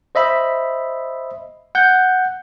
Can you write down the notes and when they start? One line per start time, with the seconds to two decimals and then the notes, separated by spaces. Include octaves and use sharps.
0.15 C5 D#5 E5 B5
1.75 F#5 G6